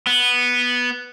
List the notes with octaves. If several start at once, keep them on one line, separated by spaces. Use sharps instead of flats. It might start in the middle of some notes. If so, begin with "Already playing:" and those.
B3